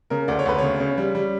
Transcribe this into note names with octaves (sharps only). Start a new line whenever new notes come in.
C#3 A#4
D2 D5
C#5
D2 B4
C#3 C#5
C#3
G3
G3